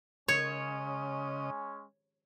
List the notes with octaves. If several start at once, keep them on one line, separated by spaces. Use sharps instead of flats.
C#3 G#3 C#4 C#5 D#5